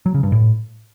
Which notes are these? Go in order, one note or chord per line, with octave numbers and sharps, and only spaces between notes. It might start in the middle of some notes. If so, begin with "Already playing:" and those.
F#3
C#3
G2
A2